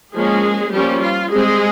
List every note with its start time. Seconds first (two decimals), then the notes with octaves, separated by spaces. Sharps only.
0.15 F3 G#3 A#3 C#4 G#4
0.73 F3 G3 A#3 C#4 G4
1.02 F4
1.32 G3 G#3 C4 G#4